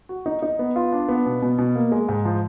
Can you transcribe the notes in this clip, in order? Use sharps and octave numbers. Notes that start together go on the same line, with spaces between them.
F#4
D#4
D#4
B3
F4
D4
B3
B2
B2
B2
A#3
G#3
G#2
F3